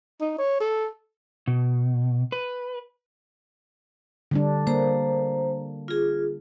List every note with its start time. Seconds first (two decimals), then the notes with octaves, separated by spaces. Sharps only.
0.21 D#4
0.38 C#5
0.60 A4
1.48 B2
2.32 B4
4.31 D3 G3 D4
4.67 A#3 C5 A#5
5.88 F4 G#4